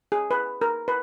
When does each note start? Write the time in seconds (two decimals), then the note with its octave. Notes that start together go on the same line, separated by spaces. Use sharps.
0.12 G#4
0.31 B4
0.61 A#4
0.88 B4